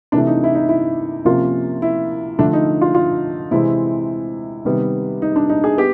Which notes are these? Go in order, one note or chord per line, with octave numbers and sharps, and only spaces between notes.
C3 E3 A3 D4
D#4
E4
D#4
E4
C3 F3 A#3 C#4 F4
E4
D3 F3 A3 D4
D#4
F4
F4
C3 E3 G#3 C4 E4
C3 D#3 G3 B3
D#4
D4
D#4
G#4
B3 G4